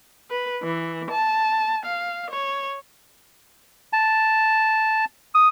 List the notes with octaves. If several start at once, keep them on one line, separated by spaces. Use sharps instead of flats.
B4
E3
A5
F5
C#5
A5
D#6